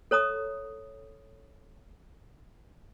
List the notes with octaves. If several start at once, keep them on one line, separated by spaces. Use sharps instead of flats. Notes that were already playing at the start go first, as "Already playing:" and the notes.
A4 C#5 A#5 D#6